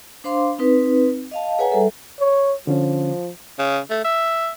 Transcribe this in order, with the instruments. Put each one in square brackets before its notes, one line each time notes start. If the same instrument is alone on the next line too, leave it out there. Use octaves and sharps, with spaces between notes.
[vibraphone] D4 C5 F5 C6 D6
C4 D#4 B4
D#5 F5 A5
G#4 B4 C#5 F#5 G#5 A#5
G3 A4 E5
[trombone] C#5
[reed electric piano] D3 C#4 [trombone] F3
[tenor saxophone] C#3
A3
E5